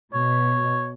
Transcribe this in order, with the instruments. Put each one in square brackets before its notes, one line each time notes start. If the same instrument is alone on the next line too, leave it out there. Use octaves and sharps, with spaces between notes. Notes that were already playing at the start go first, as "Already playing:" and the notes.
[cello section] B2 [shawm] C#5